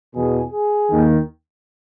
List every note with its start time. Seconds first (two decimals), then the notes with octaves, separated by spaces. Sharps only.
0.16 E2 B2 G#4
0.53 G#4
0.90 D#2 D#3